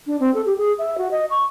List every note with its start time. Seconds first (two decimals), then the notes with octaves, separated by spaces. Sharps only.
0.07 D4
0.20 C4
0.34 A4
0.46 G4
0.58 G#4
0.79 E5
0.98 F#4
1.11 D#5
1.30 C#6